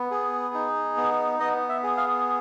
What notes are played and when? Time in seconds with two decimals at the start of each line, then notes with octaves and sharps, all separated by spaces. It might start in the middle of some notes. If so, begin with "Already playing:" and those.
Already playing: B3
0.11 G#4
0.54 D#4
0.97 B3
1.40 B3 D#5
1.69 E5
1.83 G#4
1.97 F5